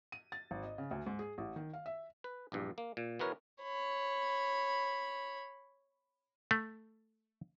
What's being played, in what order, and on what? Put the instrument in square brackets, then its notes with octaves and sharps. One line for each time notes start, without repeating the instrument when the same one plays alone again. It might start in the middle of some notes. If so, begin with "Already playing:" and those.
[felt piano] D#7
A6
G#1
D#5
C#3
D2
G#2
G#4
A1
D#3
F5
E5
[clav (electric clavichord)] B4
A#1 E2 G2
A#3
A#2
E3 B3 F#4 A#4 B4 C#5
[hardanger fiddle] C#5 B5
[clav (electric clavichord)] A3